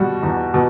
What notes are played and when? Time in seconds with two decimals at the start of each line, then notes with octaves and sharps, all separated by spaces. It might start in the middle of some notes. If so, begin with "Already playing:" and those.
Already playing: B2 G3 F#4
0.23 E2
0.54 B2